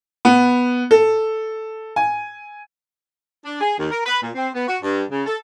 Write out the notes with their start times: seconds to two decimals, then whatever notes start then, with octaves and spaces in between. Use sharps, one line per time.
0.25 B3
0.91 A4
1.96 G#5
3.45 D4
3.61 G#4
3.78 D#2
3.91 A#4
4.06 B4
4.22 A#2
4.35 C4
4.54 B3
4.68 F#4
4.82 G2
5.11 C#3
5.26 A4